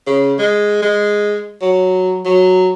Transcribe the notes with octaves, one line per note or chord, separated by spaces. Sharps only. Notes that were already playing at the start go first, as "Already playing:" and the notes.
C#3
G#3
G#3
F#3
F#3